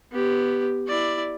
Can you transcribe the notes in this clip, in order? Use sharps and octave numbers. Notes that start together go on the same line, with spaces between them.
B3 G4
E4 D5